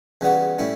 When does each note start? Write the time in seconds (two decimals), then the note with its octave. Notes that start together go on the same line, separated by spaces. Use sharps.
0.21 E2 C#3 G3 B3 F#4
0.59 A2 G3 C#4 E4